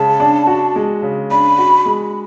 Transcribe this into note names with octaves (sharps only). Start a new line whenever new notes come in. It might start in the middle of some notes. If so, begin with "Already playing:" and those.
Already playing: C#3 G#3 A5
D4
F#4
G#3
C#3
D4 B5
F#4
G#3